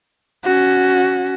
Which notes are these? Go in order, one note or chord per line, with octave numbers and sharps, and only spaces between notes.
C#4 F#4